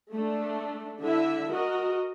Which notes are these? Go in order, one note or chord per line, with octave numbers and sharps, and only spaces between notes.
A3 D4
D3 E4 E5
F#4 A#4 D#5